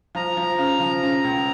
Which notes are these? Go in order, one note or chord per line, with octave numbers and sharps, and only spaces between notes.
F3 A#5
F3
C#3
F3
C#3
C#2